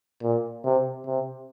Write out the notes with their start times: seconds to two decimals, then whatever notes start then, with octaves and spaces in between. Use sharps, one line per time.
0.23 A#2
0.65 C3
1.06 C3